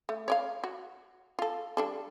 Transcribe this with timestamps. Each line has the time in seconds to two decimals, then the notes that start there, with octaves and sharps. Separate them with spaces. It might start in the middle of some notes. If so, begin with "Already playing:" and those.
0.09 A3
0.28 C#5 D5 F5
0.64 F#4
1.39 F4 A4
1.77 G3 D4 A4